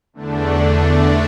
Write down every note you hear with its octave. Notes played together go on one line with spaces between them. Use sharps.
E2 D3 A3 D4